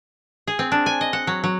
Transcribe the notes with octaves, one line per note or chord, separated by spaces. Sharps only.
G#4
C4
D4
G#5
D#5
F#5
F#3
F#3